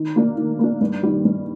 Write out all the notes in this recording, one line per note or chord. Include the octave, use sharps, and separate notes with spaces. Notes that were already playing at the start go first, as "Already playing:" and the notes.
Already playing: D#3
A#3 D4
D#3
A#3 D4
G2
D#3 G3
G2